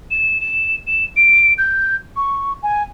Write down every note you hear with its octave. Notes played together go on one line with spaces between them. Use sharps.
E7
E7
E7
D7
G6
C#6
G#5